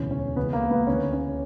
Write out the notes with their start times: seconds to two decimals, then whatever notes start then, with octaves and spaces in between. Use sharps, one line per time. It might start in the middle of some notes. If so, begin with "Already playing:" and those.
Already playing: E1 D2 C#3 E3 C#4
0.11 C#4
0.36 C#2 C#3 E3 B3
0.53 A#3
0.70 B3
0.87 D2 C#3 E3 C#4
1.13 C#4